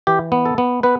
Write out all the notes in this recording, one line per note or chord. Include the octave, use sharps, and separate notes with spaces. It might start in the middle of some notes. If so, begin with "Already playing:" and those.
E3 G4
B3
A4
B3
B3 B4